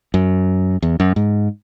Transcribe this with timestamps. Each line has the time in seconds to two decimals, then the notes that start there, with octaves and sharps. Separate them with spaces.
0.14 F#2
0.82 E2
1.00 F#2
1.16 G#2